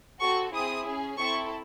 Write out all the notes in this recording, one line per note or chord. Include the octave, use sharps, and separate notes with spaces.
C4 F#4 A4 C#6
C4 E4 G#4 D#6
C#4 G#4
C4 E4 A4 C#6